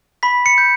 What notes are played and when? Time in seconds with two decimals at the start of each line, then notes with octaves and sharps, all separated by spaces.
0.23 B5 B6
0.46 C#7
0.58 G6